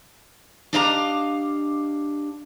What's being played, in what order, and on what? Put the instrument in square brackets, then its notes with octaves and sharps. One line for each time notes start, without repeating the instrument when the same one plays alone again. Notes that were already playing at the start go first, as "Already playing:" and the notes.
[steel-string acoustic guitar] D4 G4 D#5 F5 A5 A#5